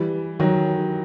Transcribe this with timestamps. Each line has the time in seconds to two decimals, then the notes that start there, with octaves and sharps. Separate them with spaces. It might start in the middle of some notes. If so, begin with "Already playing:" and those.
Already playing: E3 G3
0.40 D#3 F#3